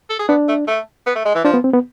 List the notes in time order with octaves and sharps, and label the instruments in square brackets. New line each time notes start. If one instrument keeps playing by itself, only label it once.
[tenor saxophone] A4
G#4
[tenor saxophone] B3 [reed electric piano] D4
[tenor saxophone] A3
A3
B3
A3
G#3
E3
[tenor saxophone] F3 [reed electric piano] D4
[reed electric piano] B3
C4
B3